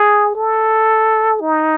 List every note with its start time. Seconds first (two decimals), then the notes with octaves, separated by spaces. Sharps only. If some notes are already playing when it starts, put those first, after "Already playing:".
Already playing: G#4
0.35 A4
1.41 D#4